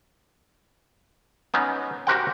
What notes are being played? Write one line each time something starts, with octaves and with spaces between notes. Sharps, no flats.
B3 C#4 D#4
F#4 G4 A#4 C5 F#5 G5